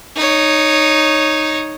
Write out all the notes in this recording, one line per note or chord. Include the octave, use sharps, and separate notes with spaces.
D#4 C#5